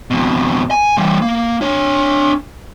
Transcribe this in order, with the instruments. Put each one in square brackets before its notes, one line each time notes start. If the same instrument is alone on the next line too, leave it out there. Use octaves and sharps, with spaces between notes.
[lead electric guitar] F2 B2
G#5
E3 G3
A#3
D4 C#5